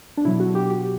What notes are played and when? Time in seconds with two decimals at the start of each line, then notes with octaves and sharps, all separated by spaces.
0.17 D4
0.25 B2 F#3 E4
0.40 F#4
0.55 G4
0.70 G4